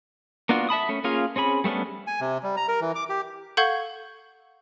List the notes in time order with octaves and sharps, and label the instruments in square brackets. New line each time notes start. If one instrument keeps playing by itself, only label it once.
[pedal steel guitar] A#3 B3 D4 F4 F#4
E5 A5 B5 D#6
A3 C#4
A#3 C#4 F4 G#4 F5
C4 C#4 G#4 B5
G3 A3 B3 C#4 D4
[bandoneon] G#5
C3
G3
A#5
A#4
E3
D6
G4
[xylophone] A4 F5 F#5 C#6 G6 G#6